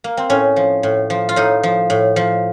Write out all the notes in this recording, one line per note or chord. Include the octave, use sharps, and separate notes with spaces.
A#3
C4
A2 C#4
F3
A2
F3
F4
A2 D#4
F3
A2
F3